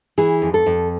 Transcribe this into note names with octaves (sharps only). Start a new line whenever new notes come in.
E3 G#4
F2
A4
F2